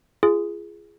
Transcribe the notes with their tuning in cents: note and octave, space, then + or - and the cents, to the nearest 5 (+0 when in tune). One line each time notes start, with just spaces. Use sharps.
F4 -30 G#4 +0